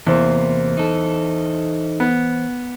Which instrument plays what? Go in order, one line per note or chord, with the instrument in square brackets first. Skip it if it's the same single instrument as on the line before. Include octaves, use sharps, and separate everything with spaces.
[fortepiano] E2 [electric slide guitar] C3 A#3 [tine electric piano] E3 C5
[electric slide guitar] D#4 A4
[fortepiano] B3